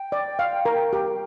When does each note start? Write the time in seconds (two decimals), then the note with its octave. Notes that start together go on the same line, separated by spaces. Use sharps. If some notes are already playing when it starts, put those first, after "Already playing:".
Already playing: G5
0.12 D5
0.39 F5
0.65 A#4
0.93 G4